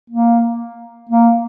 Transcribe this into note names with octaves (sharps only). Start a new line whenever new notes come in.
A#3
A#3